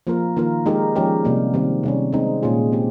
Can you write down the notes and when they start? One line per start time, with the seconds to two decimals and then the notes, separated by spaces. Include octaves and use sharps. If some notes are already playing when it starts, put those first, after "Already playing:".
0.07 F3 A#3 F4 A#4
0.36 D#3 A#3 F4 A#4
0.66 G#3 D#4 G4 A#4
0.96 F3 G#3 C#4 G4 A#4
1.25 C3 G3 A#3
1.54 D#3 G3 C4
1.83 C3 G3 C#4
2.13 G#3 C4 D#4
2.43 A#2 G#3 C#4 F4 G#4
2.72 G#3 C4 G4